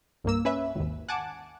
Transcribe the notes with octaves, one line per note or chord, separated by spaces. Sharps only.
C2 G2 A#3 E6
C#4 B4 E5
G#1 D#2
F#5 G#5 A5 D6